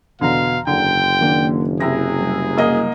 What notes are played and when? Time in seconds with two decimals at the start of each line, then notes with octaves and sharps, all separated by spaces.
0.21 E2 B2 D3 F5 A#5
0.67 F#1 D3 G5
1.20 D#3 A#3 D4
1.80 C3 E4 G#4 A#6
2.19 F#3 G3
2.57 C2 A#3 D#5